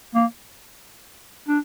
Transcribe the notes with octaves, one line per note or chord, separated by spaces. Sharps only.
A#3
D4